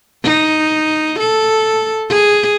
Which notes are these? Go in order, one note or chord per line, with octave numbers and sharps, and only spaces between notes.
D#4
A4
G#4